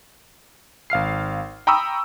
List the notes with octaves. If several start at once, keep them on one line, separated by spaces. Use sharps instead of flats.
G#1 F5 F6 C7
G5 A#5 B5 C#6 D#6 E6